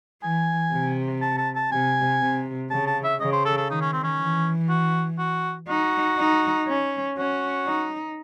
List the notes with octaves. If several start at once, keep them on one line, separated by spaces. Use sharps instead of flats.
E3 G#5
C3
A5
A5
A5
C3 G#5
C3
C#3 A5
A5
E5
C#3 D#5
C5
A4
A4
D#3 D#4
C#4
C4
C#4
E3
F#4
F#4
D#4 F#4
D#4
C#4
C#4 F#4
D#4